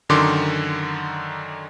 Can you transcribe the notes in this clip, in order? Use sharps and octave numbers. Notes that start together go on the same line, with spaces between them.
F#2 D3 D#3 C6 D6